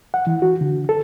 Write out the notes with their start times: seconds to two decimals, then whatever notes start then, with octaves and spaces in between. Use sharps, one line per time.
0.14 F#5
0.27 E3
0.42 F#4
0.61 D3
0.89 A4